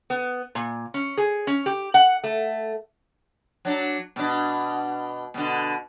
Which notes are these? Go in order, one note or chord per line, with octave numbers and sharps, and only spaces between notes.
B3
A#2
C#4
G#4
C#4
G4
F#5
A3
F#3 D4
B2 D4
B2 D3